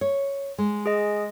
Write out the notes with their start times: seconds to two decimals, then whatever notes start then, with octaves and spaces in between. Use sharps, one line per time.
0.01 C#5
0.58 G#3
0.86 G#4 D#5